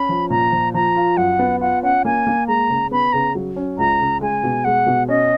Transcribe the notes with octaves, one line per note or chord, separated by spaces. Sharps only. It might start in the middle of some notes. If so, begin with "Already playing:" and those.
Already playing: C#4 B5
F3
A#2 A#5
F3
F3 A#5
F4
F#2 F#5
B3
F4 F#5
C#4 F#5
A#3 G#5
A#3
G#3 A#5
C#3
B3 B5
C#3 A#5
F#3
C#4
C#2 A#5
C#3
G#3 G#5
B2
G#3 F#5
B2
C#4 D#5